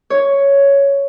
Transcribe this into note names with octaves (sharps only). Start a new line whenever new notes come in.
C#5